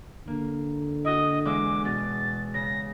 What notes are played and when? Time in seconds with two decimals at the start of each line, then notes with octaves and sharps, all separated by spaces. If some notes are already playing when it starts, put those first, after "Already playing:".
0.27 D3 A#3
1.05 E4 F#4 D#5
1.45 E2 G#3 E5 D6
1.85 B2 A6
2.54 C#3 A#6